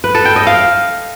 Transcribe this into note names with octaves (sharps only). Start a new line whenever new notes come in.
B4
A4
G5
D#5
F5